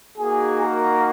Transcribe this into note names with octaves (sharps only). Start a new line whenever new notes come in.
A#3 D#4 F#4 G#4 G#5
A#4 A#5